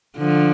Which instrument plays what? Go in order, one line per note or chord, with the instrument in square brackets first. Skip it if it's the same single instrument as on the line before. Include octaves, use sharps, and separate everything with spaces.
[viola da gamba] D3 F3